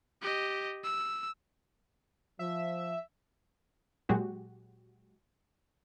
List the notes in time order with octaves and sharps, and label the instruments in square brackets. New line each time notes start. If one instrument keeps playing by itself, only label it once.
[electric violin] G4 D#5
E6
[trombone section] F3 [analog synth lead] E5
[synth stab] A#2 F#3 G#3 F#4 G4